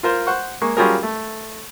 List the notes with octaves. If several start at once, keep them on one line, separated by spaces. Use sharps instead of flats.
F4 A#4 C5
C5 F#5 C#6
G#3 A#3 C#6
F#3 G3 C#4 F4 G#4 A#4
A3